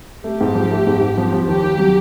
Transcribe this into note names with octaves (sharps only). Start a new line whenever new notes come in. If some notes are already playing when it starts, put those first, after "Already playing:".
A3 G4
G#2
F3
A3
G#2
G#2
F3
F3
D#2 G4
D#2
F#3